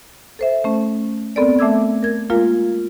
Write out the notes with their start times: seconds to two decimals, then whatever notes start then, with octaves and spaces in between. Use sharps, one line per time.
0.39 A4 C5 E5
0.64 A3 C#4
1.36 B3 C4 A4 A#4 D5
1.59 A3 E5 D6 E6 G#6
2.03 A#4 G#6
2.30 G#3 A#3 F4 A#4 F5